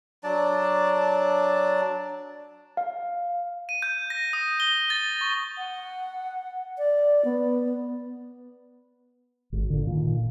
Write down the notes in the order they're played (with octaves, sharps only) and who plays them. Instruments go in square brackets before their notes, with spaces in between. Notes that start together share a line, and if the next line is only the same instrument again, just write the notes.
[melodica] F#3 D4 D5 A5
[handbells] F5
[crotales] D#7
G6
A#6
D#6
G7
A6
C#6
[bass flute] F#5
D5
B3
[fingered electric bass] G#1
A#2 D3
A#2 D#3